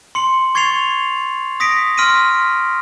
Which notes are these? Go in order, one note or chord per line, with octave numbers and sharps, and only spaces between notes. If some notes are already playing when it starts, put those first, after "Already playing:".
C6 C#7 F#7
C#6 G#6 A6 C7 C#7 F7
D#6 A#6 B6 C#7 D7
C6 F6 B6 D7 D#7